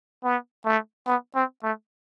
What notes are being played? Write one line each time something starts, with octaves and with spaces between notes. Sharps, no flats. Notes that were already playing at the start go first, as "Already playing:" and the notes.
B3
A3
B3
C4
A3